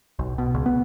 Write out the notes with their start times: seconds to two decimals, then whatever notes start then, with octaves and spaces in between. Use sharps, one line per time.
0.19 B1
0.38 B2
0.54 C#2
0.66 B3